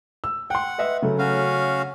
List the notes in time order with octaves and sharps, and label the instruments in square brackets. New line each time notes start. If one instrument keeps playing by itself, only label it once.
[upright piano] E6
[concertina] F#5 [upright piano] G5 C6
[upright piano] B4 D#5 E5
C#3 F#3 A3
[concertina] C#4 F#4 F5